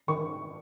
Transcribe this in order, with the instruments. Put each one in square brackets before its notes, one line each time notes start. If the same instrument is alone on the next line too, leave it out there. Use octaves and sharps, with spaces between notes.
[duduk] D#3 [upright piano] C#6